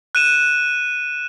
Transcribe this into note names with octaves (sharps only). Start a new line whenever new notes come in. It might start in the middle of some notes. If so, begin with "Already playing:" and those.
F#6 D#7 E7